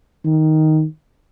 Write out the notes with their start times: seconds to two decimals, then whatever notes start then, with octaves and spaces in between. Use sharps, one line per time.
0.25 D#3